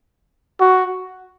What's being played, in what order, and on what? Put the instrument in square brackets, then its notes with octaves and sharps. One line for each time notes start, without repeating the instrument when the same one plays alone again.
[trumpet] F#4